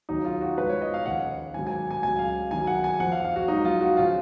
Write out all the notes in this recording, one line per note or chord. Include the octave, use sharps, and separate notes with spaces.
D#2 C#3 F#3 D#4
F4
F#4
G#2 F3 B4
C#5
D#5
F5
D#2 C#3 F3 F#5
G#2 D#3 F#3 G#5
G#5
G#5
C#2 C#3 F#3 G#5
F5
F#2 D#3 F#3 G#5
F#5
G#5
F2 F3 F#5
F5
F5
F#4
G#2 F#3 D#4
F4
F#4
C#3 F3 F4